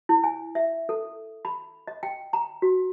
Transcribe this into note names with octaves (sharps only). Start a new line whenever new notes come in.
E4
G#5
E5
A4
B5
D#5
G5
A#5
F#4